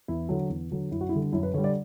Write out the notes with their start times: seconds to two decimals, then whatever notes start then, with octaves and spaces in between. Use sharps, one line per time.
0.08 E2 E4
0.29 D3 F#3
0.50 E2
0.71 D3 F#3
0.91 F#2 E4
1.01 F#4
1.09 E4
1.13 D3 G3
1.32 F#2 E4
1.43 B4
1.54 D3 C#5
1.58 G3
1.64 D5